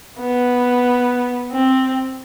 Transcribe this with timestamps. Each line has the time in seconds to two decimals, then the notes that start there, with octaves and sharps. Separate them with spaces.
0.20 B3
1.52 C4